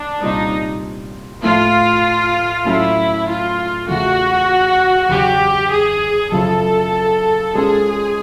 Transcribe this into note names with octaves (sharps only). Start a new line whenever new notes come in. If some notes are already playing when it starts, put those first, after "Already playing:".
Already playing: D4
C2 A#2 G3 C4 D#4 F4
A2 F3 A3 F4
A2 F#3 A3 C#4 E4
F4
E2 C#3 F3 A3 F#4
E2 C#3 F#3 G4
G#4
F#2 C#3 F3 A4
B2 G#3 C#4 F4 G#4